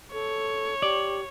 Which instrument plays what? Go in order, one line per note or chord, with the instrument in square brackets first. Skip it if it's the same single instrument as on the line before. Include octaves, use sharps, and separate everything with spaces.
[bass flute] A4 [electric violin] C#5
[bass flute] G4 [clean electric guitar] D5